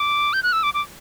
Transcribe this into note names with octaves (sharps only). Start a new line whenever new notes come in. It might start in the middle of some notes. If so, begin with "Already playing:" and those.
Already playing: D6
G6
F#6
E6
D6
D6